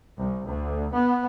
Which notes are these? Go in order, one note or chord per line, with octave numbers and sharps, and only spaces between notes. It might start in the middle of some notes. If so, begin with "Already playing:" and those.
C2
D2
B3